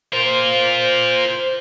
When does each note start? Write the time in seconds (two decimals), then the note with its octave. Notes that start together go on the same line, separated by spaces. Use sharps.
0.13 F4 A#4 C5